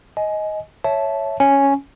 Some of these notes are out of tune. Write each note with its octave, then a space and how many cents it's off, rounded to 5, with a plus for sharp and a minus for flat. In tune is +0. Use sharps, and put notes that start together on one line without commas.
D#5 +10 G#5 +20
C#5 +0 E5 +0 A5 -15
C#4 +0 G#5 +0